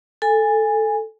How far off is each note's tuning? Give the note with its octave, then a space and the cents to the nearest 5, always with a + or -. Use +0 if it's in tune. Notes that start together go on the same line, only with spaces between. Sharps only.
A4 +0 G#5 -15